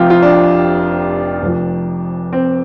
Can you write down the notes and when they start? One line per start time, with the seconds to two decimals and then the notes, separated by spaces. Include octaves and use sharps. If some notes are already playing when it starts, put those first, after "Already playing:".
Already playing: F1 F2 C3 F3 F4 G4
0.10 F4
0.22 D4
1.42 F1 F2 F3
2.33 C4